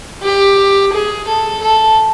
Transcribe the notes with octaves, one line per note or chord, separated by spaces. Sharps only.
G4
G#4
A4
A4